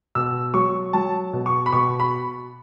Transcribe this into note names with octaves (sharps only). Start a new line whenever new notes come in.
B2 E6
F#3 C#6
F#3 A5
B2
C#6
B5
B2 C#6
B5